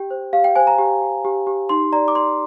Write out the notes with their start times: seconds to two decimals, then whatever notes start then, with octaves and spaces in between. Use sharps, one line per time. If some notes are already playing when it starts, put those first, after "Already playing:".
Already playing: G4 G5
0.11 C5
0.33 G4 F5
0.44 G5
0.56 C5 G#5
0.67 A#5
0.78 G4
1.02 G4
1.24 G4
1.47 G4
1.69 D#4 C6
1.92 D5 A#5
2.08 D6
2.15 D5 C6